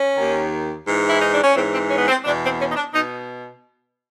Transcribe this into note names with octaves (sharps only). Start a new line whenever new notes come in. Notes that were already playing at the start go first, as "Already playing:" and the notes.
Already playing: C#4
D#2 D#3
G#2 E3
E4
D#4
D4
C#4
G#2 E3 C4
C4
C#4
B3
C4
E2 B2 D4
C4
C#4
D#4
D4
B2 D#4